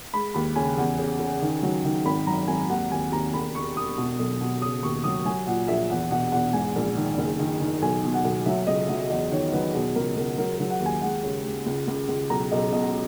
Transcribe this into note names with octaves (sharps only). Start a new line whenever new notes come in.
G#3 B5
D#2 B5
C#3 G#5
E2
C#3
C#3
D#3
F#3
D#3
G#1 B5
F#2 A#5
G#1 G#5
D#2 F#5
D#2 G#5
D#2 A#5
E1 B5
E1 C#6
E1 D#6
B2
B1
B2
C#3 D#6
D#2 C#6
F#3 D#6
F#3 G#5
A#2 F#5
A#1 E5
E2 F#5
B2 F#5
E2 F#5
G#2 G#5
A#1
D#3
F#1
D#3
D#3
B1 G#5
B2
F#5
B1
F#3 E5
C#2 D#5
F#3 E5
E2 D#5
D#3 C#5
F#3 B4
B2 G#4
C#2 A#4
C#2 A#4
F#3 A#4
A#4
F#3
F#5
D#2
G#5
G#3 F#5
C#3
G#3
C#2
C#2
C#2
B1 A#5
B1 D#5
B2 D#5